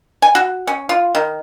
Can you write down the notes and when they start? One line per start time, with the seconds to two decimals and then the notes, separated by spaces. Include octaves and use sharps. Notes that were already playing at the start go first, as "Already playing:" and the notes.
0.22 G#5
0.35 F#4
0.67 C#4
0.89 F4
1.15 D#3